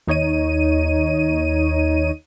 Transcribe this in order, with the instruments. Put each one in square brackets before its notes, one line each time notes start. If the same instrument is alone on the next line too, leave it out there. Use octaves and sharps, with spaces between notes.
[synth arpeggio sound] D#2 D#4 C#5 D#5 D#7